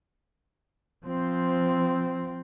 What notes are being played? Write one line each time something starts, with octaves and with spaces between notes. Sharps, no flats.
F3 C4